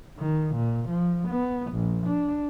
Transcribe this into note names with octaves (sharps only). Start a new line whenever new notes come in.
D#3
A#2
F3
B3
A#1
D4